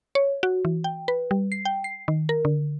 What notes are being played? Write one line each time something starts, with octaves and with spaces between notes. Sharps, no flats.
C#5
F#4
E3
G5
B4
G3
C7
G5
C7
D#3
A#4
D3